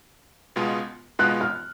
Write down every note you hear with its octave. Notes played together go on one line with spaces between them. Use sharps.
C#2 B2 G#3 B3 F4
C#2 B2 G#3 B3 F4 F#6
F6